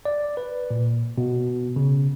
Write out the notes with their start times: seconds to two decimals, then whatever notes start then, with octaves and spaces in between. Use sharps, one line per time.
0.05 D5
0.37 B4
0.71 A#2
1.18 B2
1.76 C#3